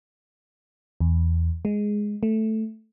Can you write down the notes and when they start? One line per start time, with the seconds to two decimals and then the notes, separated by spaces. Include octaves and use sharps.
1.00 E2
1.65 G#3
2.23 A3